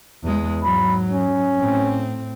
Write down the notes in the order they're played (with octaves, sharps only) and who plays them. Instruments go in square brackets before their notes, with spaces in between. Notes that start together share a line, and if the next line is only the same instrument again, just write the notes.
[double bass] E2 G#3
[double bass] G#2 F#3 [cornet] B5
[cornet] C#4
[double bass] A2 C4